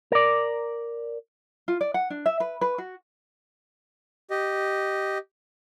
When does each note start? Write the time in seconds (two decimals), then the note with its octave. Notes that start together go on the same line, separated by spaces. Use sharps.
0.12 A#4 D5
1.68 F4
1.81 D5
1.94 F#5
2.10 D4
2.26 E5
2.40 B4
2.61 B4
2.78 F#4
4.30 G4 D#5